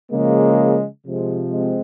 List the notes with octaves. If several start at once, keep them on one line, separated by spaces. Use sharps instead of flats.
C#3 F3 G#3 A#3
C3 F3 G#3
G#3 C4